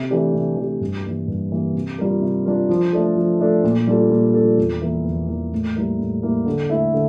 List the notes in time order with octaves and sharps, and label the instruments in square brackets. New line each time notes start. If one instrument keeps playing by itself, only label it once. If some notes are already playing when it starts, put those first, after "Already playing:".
Already playing: [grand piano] C3
E3 A3 D4 G4
C3
E3 A3 D4 G4
G2
E3 G3 A#3
G2
E3 G3 A#3
C3
G3 D4 F4 A#4
C3
G3 D4 F4 A#4
F3
A3 D4 A4
F3
A3 D4 A4
A#2
G3 D4 F4 A4
A#2
G3 D4 F4 A4
E2
E3 A#3 E4 A#4
E2
E3 A#3 E4 A#4
A2
G3 A#3 E4 A#4
A2
G3 A#3 E4 A#4
D3
A3 E4 A4 E5
D3